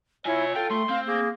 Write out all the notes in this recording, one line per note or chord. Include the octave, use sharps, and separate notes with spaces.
E4 F4 C#5 G#5
F4 A4 G5
A3 C6
C4 F5
A#3 G#4